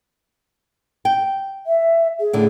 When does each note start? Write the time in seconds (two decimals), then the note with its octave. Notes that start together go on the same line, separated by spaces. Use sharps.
1.05 G5
1.66 E5
2.20 G#4
2.33 A2 D3